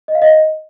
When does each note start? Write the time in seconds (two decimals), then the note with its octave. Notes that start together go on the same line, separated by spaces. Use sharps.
0.08 D#5
0.15 F5
0.22 D#5